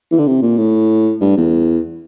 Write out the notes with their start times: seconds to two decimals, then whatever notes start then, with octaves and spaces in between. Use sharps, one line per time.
0.11 E3
0.19 D3
0.27 C3
0.42 A#2
0.58 A2
1.21 G2
1.37 E2